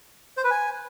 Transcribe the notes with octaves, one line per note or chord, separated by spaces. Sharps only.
C5
B4
G#5